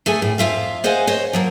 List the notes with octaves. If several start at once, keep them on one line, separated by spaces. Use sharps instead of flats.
A3 G#4 A4 G#5
A2
F2 F4 E5 F5
G#4 C5 D#5 F5 F#5 G#5
C5 C#5 D#5
F3 F#3 A#3